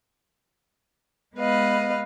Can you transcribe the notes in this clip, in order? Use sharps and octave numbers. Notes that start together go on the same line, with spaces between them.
G#3 B3 B4 D#5 F5